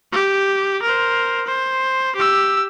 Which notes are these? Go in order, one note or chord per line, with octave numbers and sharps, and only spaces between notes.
G4
A#4 C5
C5
G4 E6